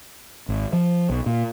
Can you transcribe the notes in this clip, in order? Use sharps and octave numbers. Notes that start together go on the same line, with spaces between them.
G#1
F3
B1
A#2